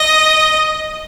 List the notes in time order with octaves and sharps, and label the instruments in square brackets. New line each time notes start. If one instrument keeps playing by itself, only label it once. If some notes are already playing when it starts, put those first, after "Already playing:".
Already playing: [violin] D#5